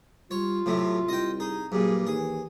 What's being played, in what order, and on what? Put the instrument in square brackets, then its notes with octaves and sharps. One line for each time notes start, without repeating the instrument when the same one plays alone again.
[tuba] G3 [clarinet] F4 [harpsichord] C#5
[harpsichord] A2 C3 A3 [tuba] F#3
[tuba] C2 [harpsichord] D#5 G5
[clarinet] D#4 [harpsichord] G#4
[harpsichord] G2 A#2 [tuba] F#3 [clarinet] G#4
[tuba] D#2 [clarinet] E3 [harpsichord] G#4